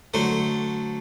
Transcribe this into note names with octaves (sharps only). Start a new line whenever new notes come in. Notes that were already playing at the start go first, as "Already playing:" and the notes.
D3 F#3 A3 C5